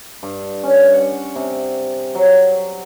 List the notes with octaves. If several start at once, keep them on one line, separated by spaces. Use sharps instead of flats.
G2
C#4
F#5
C3
F#3